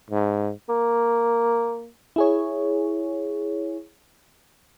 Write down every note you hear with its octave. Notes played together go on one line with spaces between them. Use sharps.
G#2
A#3
E4 G#4 C#5